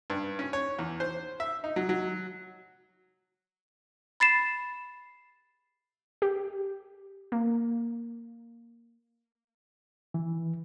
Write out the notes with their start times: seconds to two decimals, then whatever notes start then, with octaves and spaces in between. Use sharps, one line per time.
0.10 G2
0.39 C#4
0.53 C#5
0.79 E2
1.00 C5
1.40 E5
1.64 D#4
1.76 F#3
1.89 F#3
4.20 B5 A6 C7 E7
6.22 G4
7.32 A#3
10.14 E3